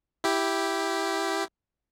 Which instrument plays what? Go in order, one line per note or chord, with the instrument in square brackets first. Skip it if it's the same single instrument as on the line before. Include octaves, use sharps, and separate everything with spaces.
[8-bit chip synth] E4 G4